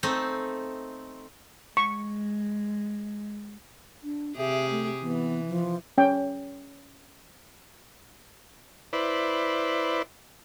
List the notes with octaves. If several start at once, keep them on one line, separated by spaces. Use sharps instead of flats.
A3 C4 D#4
G#3 C#6
D4
C3 G4 G#4 E5
A3
E3 B3
F3
C#4 G5
E4 B4 C5 D5